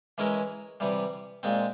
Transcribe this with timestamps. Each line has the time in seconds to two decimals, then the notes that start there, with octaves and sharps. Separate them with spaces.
0.18 E3 G#3 C#4 E4 A#4
0.80 C3 E3 G3
1.43 A#2 G#3 C4